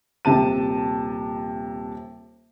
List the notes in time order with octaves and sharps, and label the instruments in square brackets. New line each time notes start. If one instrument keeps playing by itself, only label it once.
[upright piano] D#1 C3 A5 D#7